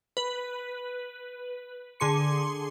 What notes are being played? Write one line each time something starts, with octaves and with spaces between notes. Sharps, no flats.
B4
D3 G#4 C6 C#7